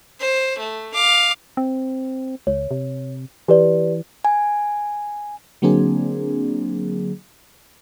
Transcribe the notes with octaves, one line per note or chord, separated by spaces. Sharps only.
C5
A3
F5 D6
C4
C#2 C#5
C3
E3 G4 B4 D5
G#5
D3 F#3 A#3 C4 D4 G#4